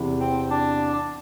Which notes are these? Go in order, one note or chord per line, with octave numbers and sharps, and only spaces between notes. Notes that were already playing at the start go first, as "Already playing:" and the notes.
Already playing: E2 C3 E3
C4
D4